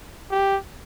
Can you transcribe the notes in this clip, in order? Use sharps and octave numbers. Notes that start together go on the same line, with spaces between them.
G4